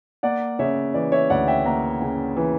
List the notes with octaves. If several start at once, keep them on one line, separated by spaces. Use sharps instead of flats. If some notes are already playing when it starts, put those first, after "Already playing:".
A#3 D5 F#5
C#3 C#5 E5
E3 D5
C#5 E5
D2 D5 F#5
E5 G5
A#3 F#5 A#5
C#3
E3